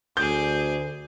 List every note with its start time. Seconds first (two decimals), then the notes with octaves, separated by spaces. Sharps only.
0.17 D2 G#4 D6 G6